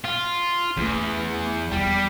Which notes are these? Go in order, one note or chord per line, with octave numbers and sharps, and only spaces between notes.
F4
E2 A3 C#4
E2 F3 G3